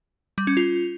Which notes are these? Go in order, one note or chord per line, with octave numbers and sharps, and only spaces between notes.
G3
C#4
F4